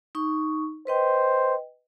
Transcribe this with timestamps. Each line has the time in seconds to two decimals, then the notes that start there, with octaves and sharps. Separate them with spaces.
0.15 D#4 C#6
0.87 B4 C5 D#5 G5